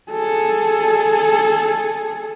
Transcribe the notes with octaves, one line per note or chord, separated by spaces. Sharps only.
G#4 A4